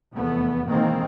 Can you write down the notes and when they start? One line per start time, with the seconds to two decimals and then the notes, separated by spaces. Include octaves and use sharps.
0.14 F1 E2 A3 B3
0.69 E2 B2 D#3 G#3 A#3 C4